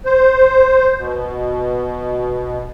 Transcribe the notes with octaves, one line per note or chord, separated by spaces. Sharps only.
C5
B2